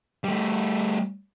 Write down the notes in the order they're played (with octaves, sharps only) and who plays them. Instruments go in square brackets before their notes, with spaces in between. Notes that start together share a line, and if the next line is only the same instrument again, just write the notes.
[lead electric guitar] G3 A3